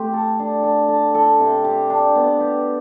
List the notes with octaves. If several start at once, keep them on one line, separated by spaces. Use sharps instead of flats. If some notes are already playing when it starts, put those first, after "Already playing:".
Already playing: A3 C4 G4
A4
D4
A4
A4
A4
C3
G4
D4
B3
G4